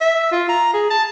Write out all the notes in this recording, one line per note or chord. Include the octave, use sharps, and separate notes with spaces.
E5
F4
A#5
G#4
A5